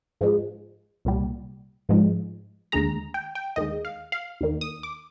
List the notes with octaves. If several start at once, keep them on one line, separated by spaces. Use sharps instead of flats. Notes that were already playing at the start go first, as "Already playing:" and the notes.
G#2 F3 G#3
C2 A#2 G3
G#2 F3 G#3
D#2 D3 G#3 A#5
G5
G5
D#2 D#3 G#3 D#5
F5
F5
D#2 D#3 A#3
D#6
D6